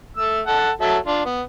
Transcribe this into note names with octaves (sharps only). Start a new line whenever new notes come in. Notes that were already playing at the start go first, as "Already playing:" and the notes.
A3 E6
A4 F#5
F#3 A4 E5
D4 F4
B3